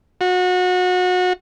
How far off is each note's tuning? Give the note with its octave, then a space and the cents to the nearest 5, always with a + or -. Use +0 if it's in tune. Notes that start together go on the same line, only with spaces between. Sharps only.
F#4 -30